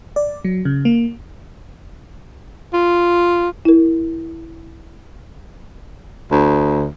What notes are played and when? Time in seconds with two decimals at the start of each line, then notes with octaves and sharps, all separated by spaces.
0.16 D5
0.44 F#3
0.65 C#3
0.85 A#3
2.74 F4
3.65 E4 A#4
6.31 D2